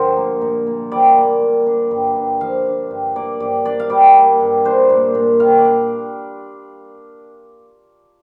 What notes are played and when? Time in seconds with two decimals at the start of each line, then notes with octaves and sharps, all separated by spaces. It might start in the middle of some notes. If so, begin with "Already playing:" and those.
Already playing: G2 D3 F3 F4 A#4 C5
0.17 A#3
0.42 A#2
0.67 A#2
0.91 G3 D5
1.16 A#3
1.41 A#2
1.66 D4
1.91 G2
2.16 G2
2.41 F3 F5
2.66 D4
2.91 G2
3.16 A#3 D5
3.40 G2 D5
3.65 D4 D5
3.80 F5
3.90 G3 D5
4.16 A#3
4.40 G2
4.65 D4 C5
4.90 A#2
5.15 A#2
5.40 G3 F5
5.58 D5
5.65 D4